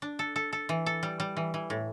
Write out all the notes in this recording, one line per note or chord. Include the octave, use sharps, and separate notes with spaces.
D4
A4
A4
A4
E3
A4
G3
G3
E3
E3
A2